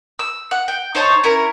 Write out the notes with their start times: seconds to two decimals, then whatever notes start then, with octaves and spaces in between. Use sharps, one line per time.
0.19 E6
0.51 F#5
0.68 G5
0.95 D#4 C5 C#5 A5
1.24 C#4 E4 A#4